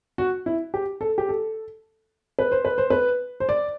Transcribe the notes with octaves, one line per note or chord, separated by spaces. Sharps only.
F#4
E4
G4
A4
G4
A4
B4
C5
B4
C5
B4
C5
D5